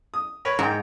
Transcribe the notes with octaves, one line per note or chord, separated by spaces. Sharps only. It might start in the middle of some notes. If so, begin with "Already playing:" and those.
D#6
A#4 B4 C#5
G#2 G5 A#5